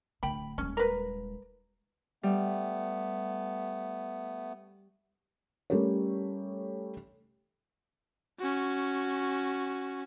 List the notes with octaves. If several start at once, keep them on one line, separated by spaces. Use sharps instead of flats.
D1 D3 G5 B5
D#1 G#3 C#4
A#4 B4
G3 A3 B3
G3 A3 C#4 G4 A#4 C#5
C#4 F#4